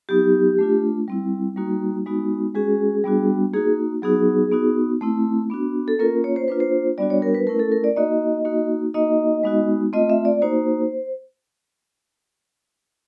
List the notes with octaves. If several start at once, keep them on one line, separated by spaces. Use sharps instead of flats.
F#3 B3 D#4 G4
A3 D4 F4
G3 C4 E4
G3 A#3 D#4 F#4
G#3 B3 D#4 F#4
G#3 C#4 F#4 G#4
G3 B3 D4 F#4
A#3 D#4 F#4 G#4
F#3 B3 D#4 F#4 G#4
B3 D#4 F#4
A3 C4 E4
B3 D4 F#4
A4
A#3 C#4 F4 A#4
C#5
C5
A#3 D4 F4 B4
C5
G3 B3 D4 F#4 D5
C#5
A#4
B4
A3 C#4 E4 A#4
A4
A#4
D5
A#3 D#4 F#4 D#5
A#3 D#4 F#4
A#3 D#4 F#4 D#5
G#3 B3 D#4 F#4
A3 C4 F4 D#5
E5
D5
A#3 D#4 F#4 C5